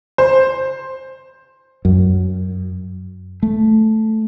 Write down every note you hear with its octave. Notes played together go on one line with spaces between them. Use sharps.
C5
F#2
A3